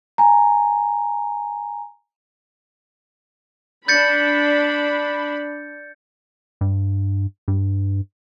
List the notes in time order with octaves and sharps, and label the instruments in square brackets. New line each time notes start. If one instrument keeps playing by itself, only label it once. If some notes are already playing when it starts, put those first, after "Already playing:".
[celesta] G#5 A#5
[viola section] D4 B5 [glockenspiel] G6 A6 C#7
[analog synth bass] G2
G2